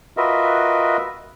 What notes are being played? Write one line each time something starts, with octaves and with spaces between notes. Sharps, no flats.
F4 F#4 A#4 B4 D#5 E5